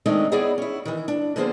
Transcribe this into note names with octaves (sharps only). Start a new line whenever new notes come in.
D#3 G#3 A3 C4 D4 D#4
B3 D#4 E4 G#4 C#5 D5
C#4 E4
D#3 E3
D4
D3 F3 A#3 B3 G#4 C5